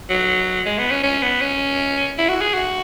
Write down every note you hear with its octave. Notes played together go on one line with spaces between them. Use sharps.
F#3
G#3
B3
C#4
C#4
B3
C#4
E4
F#4
G#4
F#4